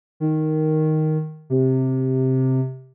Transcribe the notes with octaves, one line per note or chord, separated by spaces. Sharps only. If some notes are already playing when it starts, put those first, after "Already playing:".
D#3
C3